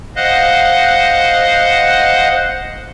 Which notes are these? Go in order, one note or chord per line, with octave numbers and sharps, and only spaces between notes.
C5 D#5 F5 F#5 F#6